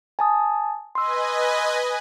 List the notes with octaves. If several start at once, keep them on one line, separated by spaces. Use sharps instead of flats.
G#5 A5 D#6
B4 D#5 G#5 C6 E6